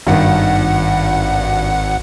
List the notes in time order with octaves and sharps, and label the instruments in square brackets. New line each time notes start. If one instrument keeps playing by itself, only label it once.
[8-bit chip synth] G#1 F#5 [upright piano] G2 D#3